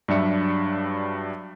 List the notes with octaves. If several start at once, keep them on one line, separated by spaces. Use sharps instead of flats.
G2 F#3 G3 D4 E5 C#7